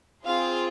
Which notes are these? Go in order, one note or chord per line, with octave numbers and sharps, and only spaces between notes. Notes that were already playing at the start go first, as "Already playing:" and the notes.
C4 F4 G#4 F5